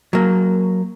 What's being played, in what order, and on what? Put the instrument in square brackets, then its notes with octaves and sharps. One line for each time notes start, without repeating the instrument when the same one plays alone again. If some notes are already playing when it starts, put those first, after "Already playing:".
[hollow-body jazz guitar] F#3 A#3